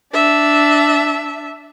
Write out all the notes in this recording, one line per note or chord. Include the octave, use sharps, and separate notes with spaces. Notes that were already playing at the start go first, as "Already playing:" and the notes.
D4 E5